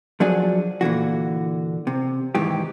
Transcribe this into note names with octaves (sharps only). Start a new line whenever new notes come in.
F3 F#3 D4 G#4
A#2 D3 E3 F#4
C3
G#2 D#3 E3 G4